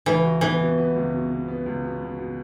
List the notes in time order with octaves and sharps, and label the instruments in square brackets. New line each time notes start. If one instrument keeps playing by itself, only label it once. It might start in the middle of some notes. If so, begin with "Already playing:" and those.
[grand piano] C#2 [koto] E3
[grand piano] F#4
[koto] E3 [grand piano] B3
[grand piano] B2
B3
C#2
B2
B2
B3
C#2
B2
B2
B2